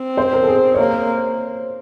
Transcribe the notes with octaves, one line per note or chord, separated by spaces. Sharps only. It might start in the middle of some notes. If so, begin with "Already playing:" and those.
Already playing: C4
C5
A#4
A4
G#4
C#5
A#3 C5